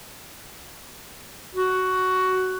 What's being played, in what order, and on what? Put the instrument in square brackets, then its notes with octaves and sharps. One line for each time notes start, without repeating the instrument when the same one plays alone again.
[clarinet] F#4